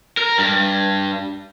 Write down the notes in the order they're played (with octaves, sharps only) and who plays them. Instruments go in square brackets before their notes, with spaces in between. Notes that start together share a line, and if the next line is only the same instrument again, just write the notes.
[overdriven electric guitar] A#4
G2